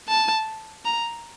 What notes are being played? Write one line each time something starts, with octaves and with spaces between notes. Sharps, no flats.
A5
A#5